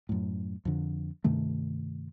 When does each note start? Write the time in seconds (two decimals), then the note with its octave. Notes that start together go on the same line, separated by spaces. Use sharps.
0.09 F#2 A2
0.65 F2 D3
1.24 G2 C3 D#3 A3